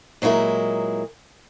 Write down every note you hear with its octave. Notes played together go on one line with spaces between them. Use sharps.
A#2 F#3 G#3 E4 A#4